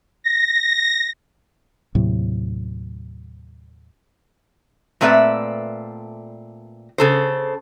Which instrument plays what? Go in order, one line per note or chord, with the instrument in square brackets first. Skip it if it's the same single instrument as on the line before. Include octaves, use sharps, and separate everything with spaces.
[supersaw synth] A#6
[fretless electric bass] D#2 A2 C3 F#3
[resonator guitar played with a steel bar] A#2 A3 C4 B4 D5 E5
C#3 A4 C5